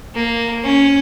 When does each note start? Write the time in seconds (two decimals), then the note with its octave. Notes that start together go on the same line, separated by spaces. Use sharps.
0.14 A#3
0.63 C#4